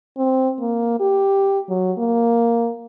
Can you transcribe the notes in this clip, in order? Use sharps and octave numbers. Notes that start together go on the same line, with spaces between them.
C4
A#3
G4
F#3
A#3